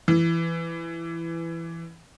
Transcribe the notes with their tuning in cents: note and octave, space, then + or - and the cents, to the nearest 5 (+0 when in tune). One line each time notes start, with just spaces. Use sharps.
E3 +15